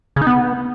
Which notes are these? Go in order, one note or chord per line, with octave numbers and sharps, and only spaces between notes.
C#3
D#4
B3